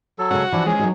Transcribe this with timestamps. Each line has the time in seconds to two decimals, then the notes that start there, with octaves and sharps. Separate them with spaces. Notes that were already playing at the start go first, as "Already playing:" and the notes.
0.19 F#3 A4
0.31 C#3 G#3 C#4 F#4
0.52 E3 F3 D4 E4
0.66 G#3 C#4 G#4
0.79 F#3 D#4 F#4